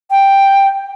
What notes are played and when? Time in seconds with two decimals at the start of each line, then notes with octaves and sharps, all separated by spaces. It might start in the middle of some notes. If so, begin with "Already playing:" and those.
0.11 G5